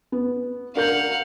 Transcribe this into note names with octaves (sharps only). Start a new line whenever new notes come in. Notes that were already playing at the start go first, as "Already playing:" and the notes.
B3
D4 A#4 F5 F#5 G6